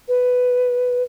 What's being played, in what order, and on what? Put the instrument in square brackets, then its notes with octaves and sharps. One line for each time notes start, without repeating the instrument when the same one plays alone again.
[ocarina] B4